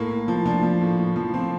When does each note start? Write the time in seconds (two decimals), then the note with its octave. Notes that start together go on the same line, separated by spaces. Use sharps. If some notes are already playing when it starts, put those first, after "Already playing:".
Already playing: A2 A#3
0.10 A2
0.28 F3
0.45 F3 D4
0.63 F3
0.81 A2
0.98 A2
1.16 F3
1.34 F3 C4